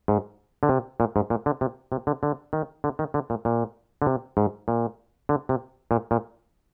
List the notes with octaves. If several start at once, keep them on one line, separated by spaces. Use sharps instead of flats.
G#2
D3
C3
A#2
G#2
A#2
D3
C3
C3
D3
D3
D#3
D3
D#3
D3
A#2
A#2
D3
C3
G#2
A#2
D3
C3
A#2
A#2